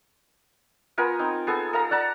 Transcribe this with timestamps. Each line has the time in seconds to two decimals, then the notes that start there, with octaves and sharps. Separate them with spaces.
0.98 B3 F4 A#4 G#5
1.19 C4 D#4
1.47 B3 G#4 A4
1.73 A4 F5 A#5
1.91 D5 F#5 A5 A#5